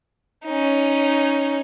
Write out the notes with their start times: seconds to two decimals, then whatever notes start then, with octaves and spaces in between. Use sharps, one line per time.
0.46 C#4 D#4